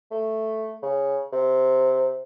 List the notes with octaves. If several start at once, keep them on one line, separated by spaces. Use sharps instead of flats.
A3
C#3
C3